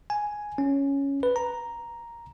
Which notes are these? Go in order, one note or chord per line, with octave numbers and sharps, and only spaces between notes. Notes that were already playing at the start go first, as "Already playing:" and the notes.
G#5
C#4
B4
A#5